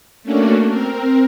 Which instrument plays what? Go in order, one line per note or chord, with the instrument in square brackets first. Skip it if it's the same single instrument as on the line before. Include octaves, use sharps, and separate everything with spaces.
[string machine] A3 A#3 C#4 D4 F#4
C4 A#4